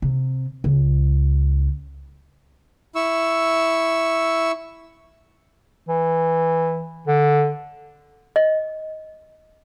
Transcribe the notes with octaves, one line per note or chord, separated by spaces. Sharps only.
C3
C#2
E4 C#6 E6
E3
D3
D#5